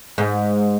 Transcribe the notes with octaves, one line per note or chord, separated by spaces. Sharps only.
G#2